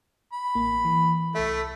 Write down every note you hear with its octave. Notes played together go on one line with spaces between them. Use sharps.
B5
A1 A#3
E3
C2 A3 A4 E5